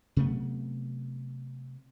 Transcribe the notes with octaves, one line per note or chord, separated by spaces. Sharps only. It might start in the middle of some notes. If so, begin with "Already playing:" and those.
C3 F#3 A3 B3